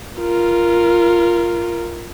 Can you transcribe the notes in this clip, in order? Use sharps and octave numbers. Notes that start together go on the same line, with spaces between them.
F4 A#4